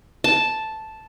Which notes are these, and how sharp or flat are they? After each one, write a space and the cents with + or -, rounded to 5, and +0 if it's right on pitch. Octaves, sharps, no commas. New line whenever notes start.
A5 -5